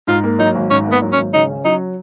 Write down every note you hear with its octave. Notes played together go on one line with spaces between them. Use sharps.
G#2 F4
A#3
F#3 D#4
G#1
G#2 C#4
A#3
B3
F#3
C#4
G#1
C#3 D#4
C#4
F#3 D#4